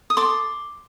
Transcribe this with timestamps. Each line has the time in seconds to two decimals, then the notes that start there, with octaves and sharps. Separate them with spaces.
0.10 D#6
0.17 A4 C6 D6